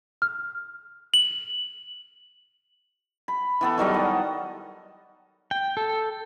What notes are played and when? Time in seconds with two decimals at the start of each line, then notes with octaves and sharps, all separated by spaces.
0.22 F6
1.14 F#7
3.28 B5
3.61 E3 B3 A4
3.78 D#3 F#3 G3 D#5
3.94 F#5
5.51 G5
5.77 A4